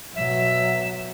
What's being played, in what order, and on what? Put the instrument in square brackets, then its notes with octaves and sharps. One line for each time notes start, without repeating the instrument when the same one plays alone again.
[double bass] B2 F#3 [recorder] E5